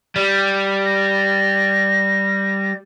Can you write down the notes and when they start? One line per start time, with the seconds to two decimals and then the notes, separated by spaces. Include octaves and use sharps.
0.16 G3
0.85 A#6